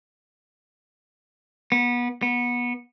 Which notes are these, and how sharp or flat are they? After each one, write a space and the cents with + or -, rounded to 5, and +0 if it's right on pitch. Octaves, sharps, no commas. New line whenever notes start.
B3 -25
B3 -20